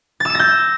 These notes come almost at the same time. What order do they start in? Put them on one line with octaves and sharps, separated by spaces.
A6 E6 E7 A#6 G6